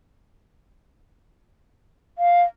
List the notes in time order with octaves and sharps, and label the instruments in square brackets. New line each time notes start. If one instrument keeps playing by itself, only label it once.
[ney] F5